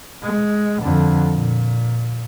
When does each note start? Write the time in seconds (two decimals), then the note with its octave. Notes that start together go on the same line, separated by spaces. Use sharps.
0.23 G#3
0.83 F2 D3
1.34 A#2